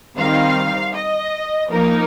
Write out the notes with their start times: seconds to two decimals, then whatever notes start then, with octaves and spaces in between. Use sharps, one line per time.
0.18 D#3 G3 C4 D#4 F5
0.94 D#5
1.70 F3 A#3 D#4 A#4